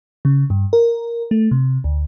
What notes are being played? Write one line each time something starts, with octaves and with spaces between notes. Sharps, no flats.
C#3
G2
A#4
A3
C3
D2